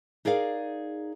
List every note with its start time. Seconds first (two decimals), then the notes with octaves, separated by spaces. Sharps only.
0.25 D#4 G#4 A#4 D5 F5